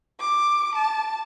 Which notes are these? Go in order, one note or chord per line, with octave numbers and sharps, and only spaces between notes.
D6
A5